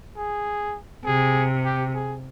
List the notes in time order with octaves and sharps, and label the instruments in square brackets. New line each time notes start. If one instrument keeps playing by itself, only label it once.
[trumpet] G#4
[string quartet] C3 [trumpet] G#4
[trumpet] G4
G#4